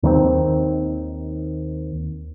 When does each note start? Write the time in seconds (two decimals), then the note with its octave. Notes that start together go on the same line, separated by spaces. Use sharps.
0.03 D#2 D#3 G3 C4